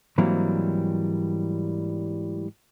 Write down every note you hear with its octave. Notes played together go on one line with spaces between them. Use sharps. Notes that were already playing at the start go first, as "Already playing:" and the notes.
G#2 E3 F#3 G3 A#3 C4